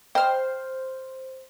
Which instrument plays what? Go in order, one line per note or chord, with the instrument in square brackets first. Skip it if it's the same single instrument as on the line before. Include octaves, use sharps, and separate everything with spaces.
[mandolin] C5 F6 [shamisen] D#5 G5